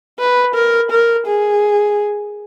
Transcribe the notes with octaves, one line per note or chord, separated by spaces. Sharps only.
B4
A#4
A#4
G#4